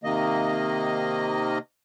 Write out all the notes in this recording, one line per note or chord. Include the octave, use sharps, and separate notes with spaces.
C3 D#3 A#3 D#5